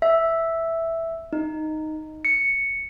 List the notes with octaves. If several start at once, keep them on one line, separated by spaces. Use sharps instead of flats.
E5
D#4
C#7